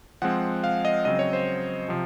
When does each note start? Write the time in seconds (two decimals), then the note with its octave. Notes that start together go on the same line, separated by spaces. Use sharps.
0.22 F3 G#3 C4 F#5
0.64 F5
0.85 D#5
1.05 C#3 F#3 C4 D#5
1.19 C#5
1.33 C5
1.88 C3 F3